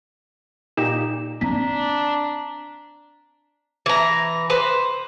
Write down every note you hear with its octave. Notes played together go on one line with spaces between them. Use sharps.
A#2 D#4 G4 E7
C4 D4 A#5 B6
E3 A#5
B4 C5